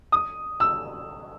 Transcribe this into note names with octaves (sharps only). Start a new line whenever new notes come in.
D#6
E6